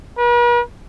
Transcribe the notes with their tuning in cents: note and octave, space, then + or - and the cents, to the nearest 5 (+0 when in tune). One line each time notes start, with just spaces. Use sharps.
B4 -45